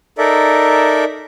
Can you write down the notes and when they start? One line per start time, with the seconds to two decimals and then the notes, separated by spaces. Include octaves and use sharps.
0.18 D#4 A4 A#4 D5 E5